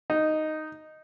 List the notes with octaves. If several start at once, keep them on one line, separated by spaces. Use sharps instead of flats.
D#4